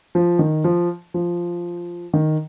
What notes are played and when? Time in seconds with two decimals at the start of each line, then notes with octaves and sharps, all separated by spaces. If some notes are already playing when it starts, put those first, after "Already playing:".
0.15 F3
0.39 D#3
0.64 F3
1.14 F3
2.13 D#3